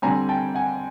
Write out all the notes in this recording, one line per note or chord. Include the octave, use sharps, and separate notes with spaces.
D3 G3 C4 G#5 A#5
G5 A5
F#5 G#5